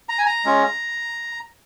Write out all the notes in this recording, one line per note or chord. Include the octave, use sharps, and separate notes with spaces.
A#5
G#5
A#5
G#3 C#4 F4